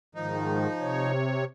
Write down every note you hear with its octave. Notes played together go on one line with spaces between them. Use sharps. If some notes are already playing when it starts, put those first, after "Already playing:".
G#2 D#3 F3 D#4
C3 C#5